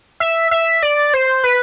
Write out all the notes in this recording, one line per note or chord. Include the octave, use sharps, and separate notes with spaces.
E5
E5
D5
C5
B4